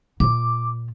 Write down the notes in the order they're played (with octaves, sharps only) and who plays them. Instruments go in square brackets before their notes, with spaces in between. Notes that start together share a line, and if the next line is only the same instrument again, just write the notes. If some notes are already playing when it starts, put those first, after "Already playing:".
[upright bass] A#2 F4 [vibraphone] D6